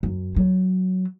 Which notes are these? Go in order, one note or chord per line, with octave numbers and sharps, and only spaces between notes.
F#2
F#3